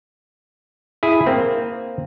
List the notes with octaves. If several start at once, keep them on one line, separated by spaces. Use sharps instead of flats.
E4 G#4
A#3 C4